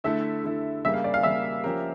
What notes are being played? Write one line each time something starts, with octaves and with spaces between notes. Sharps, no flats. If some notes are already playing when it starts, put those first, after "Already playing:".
D3 A3 E4 A4 E5
D3 A3 E4 A4
C#3 G3 A#3 E5
F5
D5
F5
C#3 G3 A#3 E5
F3 C#4 G4 A#4